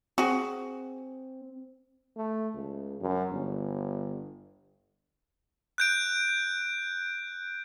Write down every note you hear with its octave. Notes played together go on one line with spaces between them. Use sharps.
C4 F#4 G#4
A3
C#2
F#2
G1
F#6 G6 D7